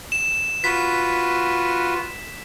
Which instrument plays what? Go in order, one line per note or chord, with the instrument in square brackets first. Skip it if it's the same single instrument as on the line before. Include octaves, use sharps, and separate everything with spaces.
[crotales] E7
[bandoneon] F4 F#4 B4 [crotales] B6